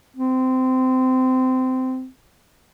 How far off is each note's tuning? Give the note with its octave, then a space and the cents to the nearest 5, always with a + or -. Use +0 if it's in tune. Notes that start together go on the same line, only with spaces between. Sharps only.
C4 -20